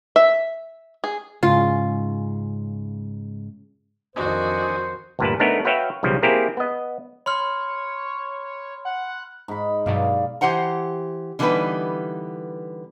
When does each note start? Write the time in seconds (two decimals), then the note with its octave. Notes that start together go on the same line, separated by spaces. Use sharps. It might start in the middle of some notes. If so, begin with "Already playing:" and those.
0.16 E5
1.04 G#4
1.43 G#2 C#3 F4
4.16 F2 D#3 D4 F#4 C5 D#5 G#5
5.19 D2 G2 A#2 A#4 B4 A5
5.40 A3 B3 D4 D#4 A#4 C#5
5.65 F#4 B4 C#5 E5 F5 G5
6.03 B1 C#3 F3 G3
6.23 A#3 C4 E4 G4 G#4 A#4
6.57 B3 D#5
7.26 C#5 B5 C6 F6
8.85 F#5
9.48 G#2 B5
9.86 G2 B2 F#3 D5 F5
10.41 E3 G4 C5 F#5 A#5
11.39 D3 E3 G3 B3 D#4 B4